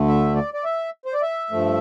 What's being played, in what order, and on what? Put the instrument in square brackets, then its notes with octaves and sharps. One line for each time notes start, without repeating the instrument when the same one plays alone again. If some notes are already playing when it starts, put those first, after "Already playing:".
Already playing: [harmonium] D2 D3 A3
E5
D5
D5
E5
C5
D5
E5
G2 F3 A3